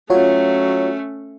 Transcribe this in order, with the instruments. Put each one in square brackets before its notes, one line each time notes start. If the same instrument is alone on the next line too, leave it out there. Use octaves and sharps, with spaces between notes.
[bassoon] F#3 [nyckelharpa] A3 C#4 [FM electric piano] F4 F#4 C#5